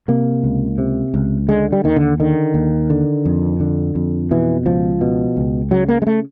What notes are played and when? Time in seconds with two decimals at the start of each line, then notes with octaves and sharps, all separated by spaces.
0.08 C3 A#3
0.44 C#2
0.78 C3
1.14 C#2
1.49 D3 G#3
1.72 G3
1.84 D#2 D#3
1.96 D3
2.20 D3 D#3
2.54 D#2
2.90 D3
3.25 F2
3.60 D3
3.95 F2
4.31 B2 E3
4.66 C#2 F3
5.01 B2
5.37 C#2
5.71 C#3 F#3
5.89 A#3
6.02 G#3
6.07 A3